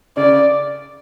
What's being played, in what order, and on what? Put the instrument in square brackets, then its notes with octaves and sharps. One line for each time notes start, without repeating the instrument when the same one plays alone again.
[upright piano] C#3 [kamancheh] D5